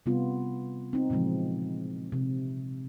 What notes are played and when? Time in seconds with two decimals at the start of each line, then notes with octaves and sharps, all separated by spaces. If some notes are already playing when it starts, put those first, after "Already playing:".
0.06 C3 G3 B3 F4
0.93 C4 D#4
1.10 A#2 C#3 E3 F3 G#3
2.12 C3